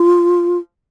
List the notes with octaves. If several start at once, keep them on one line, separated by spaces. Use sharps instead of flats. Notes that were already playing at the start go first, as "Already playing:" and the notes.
Already playing: F4